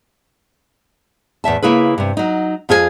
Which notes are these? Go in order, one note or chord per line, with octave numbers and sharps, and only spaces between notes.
E2 A2 E5 A5
C#3 A#3 E4 G#4 B4
G2 C3
F#3 D#4
F2 F4 G#4 A4 G#5